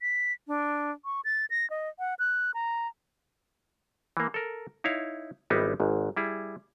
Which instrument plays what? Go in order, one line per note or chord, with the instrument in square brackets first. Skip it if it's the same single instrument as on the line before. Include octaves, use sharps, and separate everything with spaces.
[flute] B6
D4
C#6
A6
A#6
D#5
F#5
F#6
A#5
[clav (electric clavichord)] E3 A#3
A4 A#4
D#4 E4 C#5 F5
G#1 G3 B3 D#4 E4
G#1 G#2
G3 E4 G#4